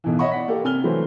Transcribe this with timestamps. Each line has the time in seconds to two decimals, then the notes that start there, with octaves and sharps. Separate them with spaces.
0.04 B1 B2 E3
0.19 C#5 D#5 E5 F#5 B5 C#6
0.32 D5 F#5 B6
0.48 A#3 G4 A4
0.64 C3 G#5 F6 G7
0.83 E3 F#3 A3 F#4 B4 C5